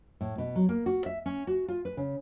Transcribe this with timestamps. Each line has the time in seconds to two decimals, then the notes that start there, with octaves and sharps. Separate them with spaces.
0.21 A2
0.38 B2
0.55 F#3
0.69 A#3
0.86 F#4
1.06 E5
1.26 C#4
1.47 F#4
1.68 F4
1.85 B4
1.97 C#3